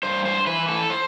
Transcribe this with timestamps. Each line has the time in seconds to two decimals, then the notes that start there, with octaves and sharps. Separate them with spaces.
0.03 G2 C5
0.25 C5
0.47 E3 B4
0.68 A4
0.90 C5